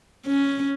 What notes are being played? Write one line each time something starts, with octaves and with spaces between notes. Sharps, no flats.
C#4